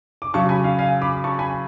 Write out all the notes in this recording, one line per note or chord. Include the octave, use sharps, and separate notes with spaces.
D6
C#3 F#3 A5 C#6
G#5 B5
F5 G#5
F5 G#5
B5 D6
A5 C#6
G#5 B5